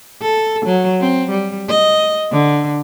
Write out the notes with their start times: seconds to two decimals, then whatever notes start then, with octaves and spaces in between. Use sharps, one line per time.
0.22 A4
0.65 F#3
1.00 C4
1.31 G3
1.69 D#5
2.32 D3